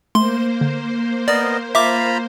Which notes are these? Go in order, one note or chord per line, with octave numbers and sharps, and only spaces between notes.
A3 A#3 C5 C6
D3
B3 A#4 D5 D#5
F4 E5 A#5 B5 D6